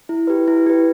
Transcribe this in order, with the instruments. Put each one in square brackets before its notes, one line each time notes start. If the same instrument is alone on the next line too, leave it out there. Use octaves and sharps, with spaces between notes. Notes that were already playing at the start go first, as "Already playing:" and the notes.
[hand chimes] E4
G4 B4
E4
G4 B4